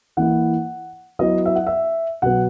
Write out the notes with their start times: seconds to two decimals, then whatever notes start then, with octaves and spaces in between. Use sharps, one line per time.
0.17 E3 A#3 E4 F#5
1.19 F#3 B3 E4 D#5
1.46 E5
1.55 F#5
1.67 E5
2.22 B2 F#3 B3 F#5